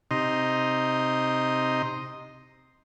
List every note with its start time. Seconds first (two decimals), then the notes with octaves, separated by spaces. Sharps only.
0.11 C3 D#4 D#5 A#5 C6